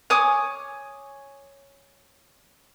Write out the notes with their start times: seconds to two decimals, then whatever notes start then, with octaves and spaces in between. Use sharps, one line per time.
0.10 C#5 G#5 D6 D#6